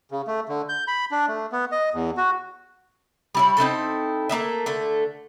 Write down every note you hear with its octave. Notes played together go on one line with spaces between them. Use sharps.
C#3
A3
D3
G6
B5
D4
A3
B3
D#5
E2
F#4
G3 E4 C#5
C4 D#4 E4 A4
A3 A#3 D#5 E5
D3 A3